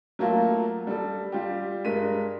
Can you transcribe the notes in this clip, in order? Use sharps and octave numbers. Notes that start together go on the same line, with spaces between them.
F#3 A3 A#3 F4
G3 A4
G3 F4 G4
G2 G#3 A#4 B6 D#7